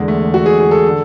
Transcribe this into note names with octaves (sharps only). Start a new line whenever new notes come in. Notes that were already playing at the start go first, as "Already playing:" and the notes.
Already playing: E2 D3 G#3
A3
F#4
G#4
G#4
A4
D3